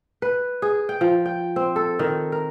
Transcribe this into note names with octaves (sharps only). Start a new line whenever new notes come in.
B4
G#4
G5
F3
G5
C4
A4
D#3
A#4